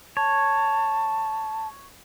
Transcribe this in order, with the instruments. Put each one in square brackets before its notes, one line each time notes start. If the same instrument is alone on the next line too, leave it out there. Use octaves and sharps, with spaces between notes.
[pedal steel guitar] C#5 [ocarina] A5